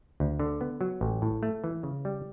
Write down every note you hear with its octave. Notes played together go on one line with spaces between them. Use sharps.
D2
D3
B3
F#3
A1
A2
A3
E3
C#3
G3